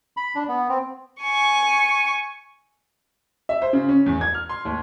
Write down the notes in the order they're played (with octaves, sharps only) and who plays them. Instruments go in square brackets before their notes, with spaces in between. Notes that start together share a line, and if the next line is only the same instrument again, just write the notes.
[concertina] B5
D4
B3
C4
[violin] G#5 C#6
[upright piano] E5
C5
C#3
C#4
E2
G#6
F6
C6
D#2